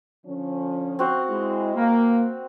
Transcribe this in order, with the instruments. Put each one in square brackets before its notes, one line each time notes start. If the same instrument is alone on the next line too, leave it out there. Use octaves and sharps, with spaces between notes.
[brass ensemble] D3 F3 C#4
[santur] C4 F#4 F5
[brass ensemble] G#3 E4
A#3